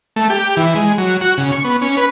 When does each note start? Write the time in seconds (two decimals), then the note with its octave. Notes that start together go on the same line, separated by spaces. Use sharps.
0.16 A3
0.30 G4
0.57 E3
0.75 G#3
0.98 F#3
1.21 F#4
1.37 C#3
1.52 C#6
1.64 B3
1.82 C#4
1.97 B4